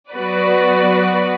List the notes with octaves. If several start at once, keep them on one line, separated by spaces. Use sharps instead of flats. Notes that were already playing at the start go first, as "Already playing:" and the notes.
F#3 B3 F#4 B4 D5